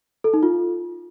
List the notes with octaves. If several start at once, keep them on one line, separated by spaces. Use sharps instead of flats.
A4
D#4
F4